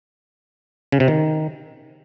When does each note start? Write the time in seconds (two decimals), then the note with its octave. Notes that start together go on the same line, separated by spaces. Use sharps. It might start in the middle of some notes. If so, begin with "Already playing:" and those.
0.92 C#3
1.00 C3
1.08 D#3